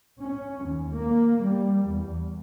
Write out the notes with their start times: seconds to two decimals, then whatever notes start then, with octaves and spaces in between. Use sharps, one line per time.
0.18 C#4
0.65 D#2
0.94 A#3
1.43 G3
1.87 E2